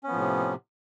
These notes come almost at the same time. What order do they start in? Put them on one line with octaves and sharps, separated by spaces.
C#4 B3 F3 A2 C3